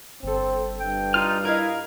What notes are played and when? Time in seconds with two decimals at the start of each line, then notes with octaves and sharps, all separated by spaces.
0.23 G1 C4 A4
0.80 G2 G5
1.14 D#4 F4 F6
1.45 E4 A#4 D#5 F5 G#6